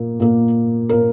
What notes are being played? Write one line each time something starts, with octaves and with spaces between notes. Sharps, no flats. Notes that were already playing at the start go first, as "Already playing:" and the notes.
Already playing: A#2 A#3
A#2 A#3
A#2 A#3 A#4